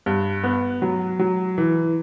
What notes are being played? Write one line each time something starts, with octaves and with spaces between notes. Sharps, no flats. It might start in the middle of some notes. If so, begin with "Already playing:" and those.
G2
B3
F#3
F#3
E3